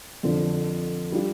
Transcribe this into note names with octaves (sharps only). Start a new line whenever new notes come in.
F2 D3 F3
G3 D4 F4